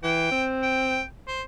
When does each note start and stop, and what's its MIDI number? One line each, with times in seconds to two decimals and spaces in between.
0.03 0.27 52
0.03 0.45 79
0.31 1.01 60
0.63 1.03 79
1.28 1.42 72